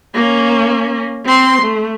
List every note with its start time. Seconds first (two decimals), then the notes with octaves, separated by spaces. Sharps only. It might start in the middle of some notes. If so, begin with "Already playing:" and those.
0.15 A#3 C#4
1.26 C4 C6
1.62 A3